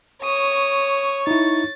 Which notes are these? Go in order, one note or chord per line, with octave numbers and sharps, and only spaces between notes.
C#5 C#6 D#6
D#4 E4 A6